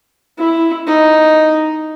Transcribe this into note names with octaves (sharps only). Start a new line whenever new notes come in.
E4
D#4